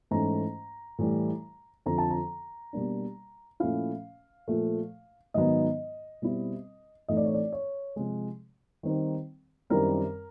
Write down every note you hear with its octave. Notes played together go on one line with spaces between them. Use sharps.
G#2 E3 A3 C#4 A#5
A2 E3 G3
F2 D3 F3 A#5
A5
A#5
B2 G3 A#3 D4
A#2 F3 A3 C#4 E4 F5
A#2 F3 A3
G#2 D#3 F#3 B3 D#4 D#5
B2 G3 C4 E4
A2 E3 A3 C4 D#4 D#5
D5
C#5
D5
C#5
C3 F3 G#3
D#3 G3 C4 D#4
F#2 D#3 G3 C4 E4 A#4